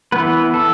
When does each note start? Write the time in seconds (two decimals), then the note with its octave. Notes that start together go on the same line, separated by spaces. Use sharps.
0.12 E3 B3 B4
0.54 A4